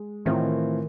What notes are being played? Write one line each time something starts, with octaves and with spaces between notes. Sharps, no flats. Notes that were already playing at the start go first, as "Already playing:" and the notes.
Already playing: G#3
A2 D#3 E3 A3 C4 F4